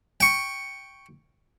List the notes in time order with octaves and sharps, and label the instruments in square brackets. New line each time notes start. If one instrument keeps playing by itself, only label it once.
[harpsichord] G5 C#6